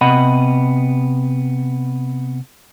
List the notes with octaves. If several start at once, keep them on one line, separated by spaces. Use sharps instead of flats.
C3 B3 D#5 F#5 B5